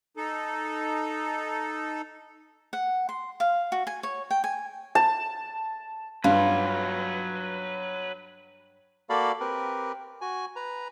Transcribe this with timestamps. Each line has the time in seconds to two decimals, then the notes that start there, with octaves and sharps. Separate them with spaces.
0.17 D#4 A4
2.73 F#5
3.09 C6
3.40 F5
3.72 F#4
3.87 G#5
4.03 C#5
4.31 G5
4.44 G#5
4.95 A5
6.24 G2 F#3 F4 B4
9.10 A#3 F#4 A4 D5 F5 B5
9.40 C4 G4 A#4 B4
10.21 F#4 G#5
10.56 B4 A#5